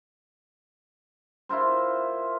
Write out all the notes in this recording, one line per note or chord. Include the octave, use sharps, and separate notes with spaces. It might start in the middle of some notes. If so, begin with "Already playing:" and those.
E4 F4 A#4 C5